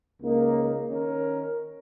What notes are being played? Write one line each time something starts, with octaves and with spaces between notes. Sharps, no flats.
C#2 C#3 A#3 D#4
D#3 C#4 A#4